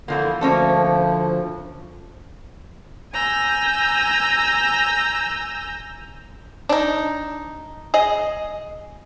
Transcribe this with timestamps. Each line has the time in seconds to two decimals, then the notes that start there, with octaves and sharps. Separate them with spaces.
0.08 D3 E3 F3 A#3
0.41 D2 F3 A#3 C#4 A4
3.13 G#5 A#5 E6 G6
6.69 D4 D#4
7.94 G#4 D#5